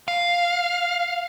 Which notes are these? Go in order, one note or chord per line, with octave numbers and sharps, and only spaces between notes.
F5